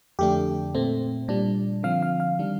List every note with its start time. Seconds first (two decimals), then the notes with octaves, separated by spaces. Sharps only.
0.19 F2 D3 A3 D4 G4
0.75 A#2 A3 C4
1.28 A#2 G3 D4
1.83 D3 F3 C4 F5
2.02 F5
2.20 F5
2.39 D#3 G3 D4